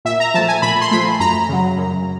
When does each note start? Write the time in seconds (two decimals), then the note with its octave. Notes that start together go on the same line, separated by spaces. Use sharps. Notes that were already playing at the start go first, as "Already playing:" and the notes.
0.05 A#2 E5
0.20 A#5
0.34 F3 A3 A5
0.48 G#5
0.62 A#2 B5
0.81 C6
0.91 F3 A3 B5
1.20 F#2 A#5
1.49 C#3 F#3
1.78 F#2